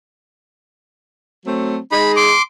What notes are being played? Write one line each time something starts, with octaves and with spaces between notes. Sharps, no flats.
F#3 A3 C4
G#3 D#4 G#4 B5
C6 D6